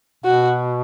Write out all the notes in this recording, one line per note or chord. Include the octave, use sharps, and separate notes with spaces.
B2 F#4